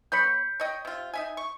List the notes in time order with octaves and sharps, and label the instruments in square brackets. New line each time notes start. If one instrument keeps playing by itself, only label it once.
[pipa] B3 C#5 B5 [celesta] G6 B6 C#7
[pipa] C#5 D#5 G5
C3 F4
D#4 E5 G#5
C#6